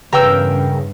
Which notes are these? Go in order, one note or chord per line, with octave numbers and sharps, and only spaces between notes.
E2 G2 C#3 A#4 B4 G5 E6